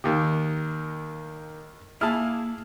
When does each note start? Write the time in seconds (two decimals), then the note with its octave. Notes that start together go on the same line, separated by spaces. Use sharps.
0.04 D#2 D#3 A#3 G4 A#4
2.01 A#3 E4 G#4 A5 F6